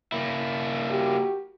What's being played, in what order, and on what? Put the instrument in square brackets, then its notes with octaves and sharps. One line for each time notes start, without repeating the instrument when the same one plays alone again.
[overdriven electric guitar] A#3 E4
[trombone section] F#4 G4